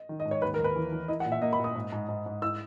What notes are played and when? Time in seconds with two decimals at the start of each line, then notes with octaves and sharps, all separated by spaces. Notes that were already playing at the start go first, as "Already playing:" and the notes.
Already playing: D#5
0.09 D#3
0.20 D#5
0.25 G#2
0.31 C#5
0.42 D#2 B4
0.54 A#4
0.59 D#2
0.64 B4
0.76 E3
0.92 E3
1.08 E4 D#5
1.20 F#5
1.25 A#2
1.32 E5
1.42 A#3 D#5
1.53 B5
1.59 A#2
1.64 D#6
1.75 G#2
1.92 G#2
2.08 G#2
2.26 G#2
2.42 E4 E6